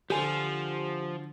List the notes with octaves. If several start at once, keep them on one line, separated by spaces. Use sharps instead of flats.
D3 F3 G4 G#5 C6